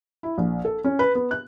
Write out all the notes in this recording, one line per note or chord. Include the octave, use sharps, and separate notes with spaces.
E4
A#1
A4
C#4
B4
B3
F#6